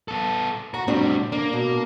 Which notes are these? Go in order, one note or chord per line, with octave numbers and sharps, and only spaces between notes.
B3 A4
F#4 A#5
A2 G3 C4 D4 F#4
A#3 D4
B2